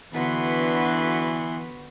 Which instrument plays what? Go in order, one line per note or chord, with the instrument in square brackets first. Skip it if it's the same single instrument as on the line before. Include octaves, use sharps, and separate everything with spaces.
[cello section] D3 F#4 B4 [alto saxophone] E3 [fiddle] B3 C6